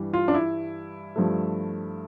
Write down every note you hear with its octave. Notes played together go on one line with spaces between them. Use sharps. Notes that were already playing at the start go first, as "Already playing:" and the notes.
Already playing: G2 E3 G3
F4
D4
E4
G2 F3 A3